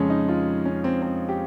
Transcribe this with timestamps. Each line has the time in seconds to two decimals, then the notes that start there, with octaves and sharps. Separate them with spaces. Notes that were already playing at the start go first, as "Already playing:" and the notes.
Already playing: F2 C#3 F3 G#3 C#4
0.10 D#4
0.28 F4
0.65 C#4
0.84 C4
1.02 C4
1.29 G4